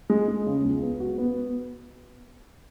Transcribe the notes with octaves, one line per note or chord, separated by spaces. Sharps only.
G#3
G#3
C#3
C#2
B3
F#4
B3